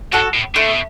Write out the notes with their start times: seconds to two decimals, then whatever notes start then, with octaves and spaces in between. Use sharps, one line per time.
0.12 F#2 F#4 A4
0.34 A2
0.55 D3 A3
0.67 B2